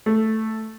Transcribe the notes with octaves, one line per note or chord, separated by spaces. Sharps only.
A3